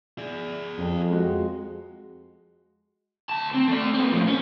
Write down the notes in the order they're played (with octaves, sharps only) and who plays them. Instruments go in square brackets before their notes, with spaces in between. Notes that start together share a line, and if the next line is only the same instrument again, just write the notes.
[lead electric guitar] G#4 D5
[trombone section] F2
[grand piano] G#3 F#4
[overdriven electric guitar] D2 A5
C4
A3 D5
A#3 C4
A2 F3
C#4